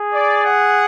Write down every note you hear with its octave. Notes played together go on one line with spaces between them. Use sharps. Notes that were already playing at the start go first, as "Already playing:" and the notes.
Already playing: G#4
D5
F#5